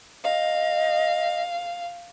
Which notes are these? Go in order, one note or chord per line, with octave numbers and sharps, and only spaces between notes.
D#5 F5